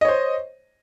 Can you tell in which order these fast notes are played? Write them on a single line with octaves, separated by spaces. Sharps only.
D#5 C#5 C5